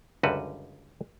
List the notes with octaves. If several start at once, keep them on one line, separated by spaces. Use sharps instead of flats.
C#2 F#2 D3 G3 F#4 B4